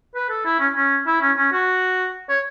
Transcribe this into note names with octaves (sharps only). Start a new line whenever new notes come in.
B4
A4
E4
C#4
C#4
E4
C#4
C#4
F#4
C#5